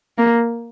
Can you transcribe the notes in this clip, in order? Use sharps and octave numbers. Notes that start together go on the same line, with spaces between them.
A#3